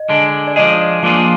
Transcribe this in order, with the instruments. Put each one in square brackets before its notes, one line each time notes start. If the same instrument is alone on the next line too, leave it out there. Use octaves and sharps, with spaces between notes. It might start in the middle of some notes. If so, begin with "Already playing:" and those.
Already playing: [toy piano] D#5
[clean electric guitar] D3 G#3 D4
[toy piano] D5
[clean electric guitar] F3 G#3 D4 G#4 [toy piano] D#5
[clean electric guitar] F3 A#3 D4 F4 G#4 [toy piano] F5